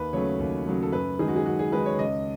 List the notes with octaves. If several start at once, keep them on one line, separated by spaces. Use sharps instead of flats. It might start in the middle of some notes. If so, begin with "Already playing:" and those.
Already playing: D#2 B4
C#3 F#3 A3 C#5
D#2
C#3 F#3 A3
A4
F#2 B4
D#3 G#3 G#4
F#4
G#4
F#2 F#4
G#4
D#3 G#3 B4
C#5
C#2 D#5